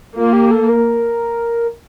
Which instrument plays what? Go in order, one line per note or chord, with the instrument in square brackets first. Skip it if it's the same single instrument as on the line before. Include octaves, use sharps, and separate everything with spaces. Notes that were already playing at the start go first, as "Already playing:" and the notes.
[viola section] A#3 [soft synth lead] F4
[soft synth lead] G4
A4
A#4